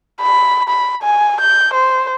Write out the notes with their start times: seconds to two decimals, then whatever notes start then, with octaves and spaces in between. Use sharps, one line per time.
0.21 B5
0.69 B5
1.03 G#5
1.41 G6
1.74 C5